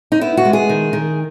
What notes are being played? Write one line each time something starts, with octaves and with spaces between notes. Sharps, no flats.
D#4
B3 E4
F#4
G#3
G#4
D#3
D#3